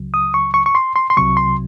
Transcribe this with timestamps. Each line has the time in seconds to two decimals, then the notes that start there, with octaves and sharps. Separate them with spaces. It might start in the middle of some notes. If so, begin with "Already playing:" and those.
Already playing: C#2 C#3 F#3
0.14 D#6
0.34 C#6
0.54 C#6
0.66 C#6
0.75 C6
0.96 C6
1.10 C6
1.17 C2 C3 F#3 C#6
1.37 C6